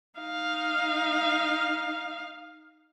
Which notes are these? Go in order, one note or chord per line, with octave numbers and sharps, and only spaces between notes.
D#4 F5